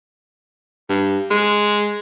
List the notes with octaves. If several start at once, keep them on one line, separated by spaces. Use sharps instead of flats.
G2
G#3